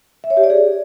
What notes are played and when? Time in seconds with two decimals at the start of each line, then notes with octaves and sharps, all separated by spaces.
0.24 E5
0.30 C#5
0.37 G4
0.44 D5
0.50 G#4